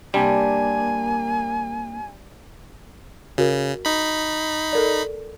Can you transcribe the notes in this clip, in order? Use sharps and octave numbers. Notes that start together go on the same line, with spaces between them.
C3 G3 A#3 D4 G#5
C#3 F#4 A#4
D#4 B5
A4 A#4 D5